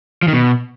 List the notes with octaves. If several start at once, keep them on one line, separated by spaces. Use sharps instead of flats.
F3
D#3
B2